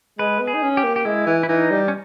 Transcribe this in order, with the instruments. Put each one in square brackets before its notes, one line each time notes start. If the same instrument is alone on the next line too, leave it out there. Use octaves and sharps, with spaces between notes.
[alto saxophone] G#3 [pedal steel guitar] B4
[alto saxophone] B3
[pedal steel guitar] G#4
[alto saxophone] D#4
C#4
[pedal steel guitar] G4
[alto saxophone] A#3
[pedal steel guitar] G4
[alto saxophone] G#3 [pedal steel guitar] E4
[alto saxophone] E3
[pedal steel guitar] E4
[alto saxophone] E3 [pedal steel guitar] D#4
[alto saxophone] G3
[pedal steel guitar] C#4